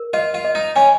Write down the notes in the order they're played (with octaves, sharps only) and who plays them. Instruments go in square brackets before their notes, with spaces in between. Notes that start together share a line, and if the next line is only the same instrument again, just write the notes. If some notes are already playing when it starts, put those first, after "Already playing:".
Already playing: [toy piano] A#4
[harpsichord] F4 [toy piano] D#5
[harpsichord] F4
[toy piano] D#5
[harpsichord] D#4
[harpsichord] C#4 [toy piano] G#5